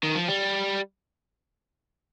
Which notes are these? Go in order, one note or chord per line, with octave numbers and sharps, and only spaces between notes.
D#3
F3
G3